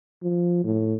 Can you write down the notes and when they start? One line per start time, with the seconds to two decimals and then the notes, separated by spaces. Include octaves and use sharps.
0.22 F3
0.64 A2